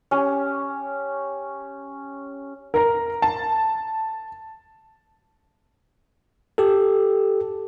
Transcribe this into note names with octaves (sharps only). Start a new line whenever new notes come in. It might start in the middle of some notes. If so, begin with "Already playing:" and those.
C#4 G4
A#4 A#5
A5
G4 A4